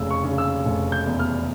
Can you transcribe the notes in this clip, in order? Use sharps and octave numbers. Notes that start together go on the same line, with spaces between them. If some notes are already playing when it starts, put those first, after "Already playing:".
Already playing: F1 C#3 E6
C#6
C#3
E6
F1
G6
E2
F6